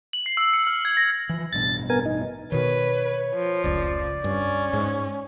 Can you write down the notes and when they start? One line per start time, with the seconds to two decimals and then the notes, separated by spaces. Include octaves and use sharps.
0.13 F#7
0.26 C7
0.37 E6
0.53 C#7
0.67 F6
0.85 G#6
0.97 A#6
1.29 E3 F3
1.53 A1 G2 B2 A6
1.90 B3 A#4 G#5
2.06 D#4
2.52 B2 D#3 B4 C#5
3.34 F3
3.64 F1 C#2 D5
4.24 G2 C#4
4.73 G#2